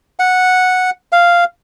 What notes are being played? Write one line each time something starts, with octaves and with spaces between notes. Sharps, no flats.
F#5
F5